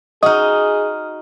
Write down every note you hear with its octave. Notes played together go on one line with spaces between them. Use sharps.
D#4 F#4 G#4 D#5 D#6 F6